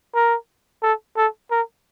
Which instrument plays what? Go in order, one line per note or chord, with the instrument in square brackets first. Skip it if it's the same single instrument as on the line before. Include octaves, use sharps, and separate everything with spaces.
[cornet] A#4
A4
A4
A#4